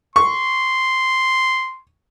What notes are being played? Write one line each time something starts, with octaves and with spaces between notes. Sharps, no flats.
C6 C#6